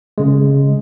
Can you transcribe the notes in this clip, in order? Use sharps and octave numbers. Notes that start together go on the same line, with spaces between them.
C#3 G#3